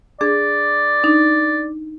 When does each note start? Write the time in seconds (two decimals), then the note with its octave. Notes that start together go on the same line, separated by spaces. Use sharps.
0.21 D4 G#4 D5
1.04 D4 D#4